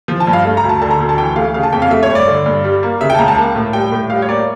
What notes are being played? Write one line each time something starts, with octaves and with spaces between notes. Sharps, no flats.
F3
A5
G2
F5
A3
A#5
D2
A5
D3 A5
A#5
D2
A5
E3 G5
A3 F5
C#3 F5
A5
F2 G5
F5
A3 E5
C#5
G2
D5
D3
G2
G3
A#3
C#3 E5
G5
A5
C#2 A#5
A5
A#3
A2
G3 G5
A2
G3 F5
C#5
A#3 D5